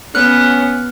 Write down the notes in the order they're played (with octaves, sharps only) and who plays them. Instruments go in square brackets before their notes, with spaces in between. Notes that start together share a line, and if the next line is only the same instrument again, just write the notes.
[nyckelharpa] B3 [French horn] C#4 [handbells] F6 F#6